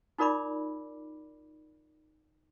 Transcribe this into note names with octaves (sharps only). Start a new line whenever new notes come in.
D#4 F4 A#4 D5 B5 D6